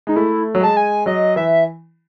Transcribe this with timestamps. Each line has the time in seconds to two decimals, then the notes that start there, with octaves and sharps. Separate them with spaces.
0.07 G#3 D#4
0.16 A3 E4
0.55 F#3
0.61 G#3 A5
0.77 G#5
1.06 F#3 D#5
1.36 E3 E5